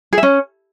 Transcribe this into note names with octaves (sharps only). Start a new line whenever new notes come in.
G#4
E5
C#4